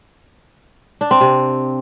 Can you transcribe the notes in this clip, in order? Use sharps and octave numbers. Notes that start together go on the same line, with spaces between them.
D4
C4
C3